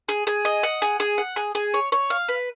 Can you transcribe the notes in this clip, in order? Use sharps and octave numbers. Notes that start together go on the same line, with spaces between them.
G#4
G#4
D#5
F#5
G#4
G#4
F#5
G#4
G#4
C#5
C#5
F5
B4